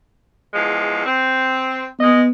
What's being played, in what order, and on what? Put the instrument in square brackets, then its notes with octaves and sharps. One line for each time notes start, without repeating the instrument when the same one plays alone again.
[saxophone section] E2 F3 G#3
C4
[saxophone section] G#3 D#5 [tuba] B3